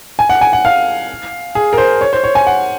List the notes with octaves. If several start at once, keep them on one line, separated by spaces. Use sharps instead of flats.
G#5
F#5
G#5
F#5
F5
G#4
A#4
C5
C#5
C5
C#5
G#5
F#5